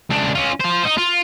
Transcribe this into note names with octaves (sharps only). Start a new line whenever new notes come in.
C#2 D4
C#4 F4
F4 C5
D#4
F4